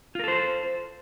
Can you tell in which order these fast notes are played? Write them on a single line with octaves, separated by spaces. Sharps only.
F4 A#4 A4 C5